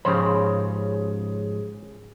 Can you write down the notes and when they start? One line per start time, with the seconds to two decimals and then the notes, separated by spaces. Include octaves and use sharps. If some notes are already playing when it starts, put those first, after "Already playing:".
0.05 G#2 C#3 F3 G#4 C5 C#5 B5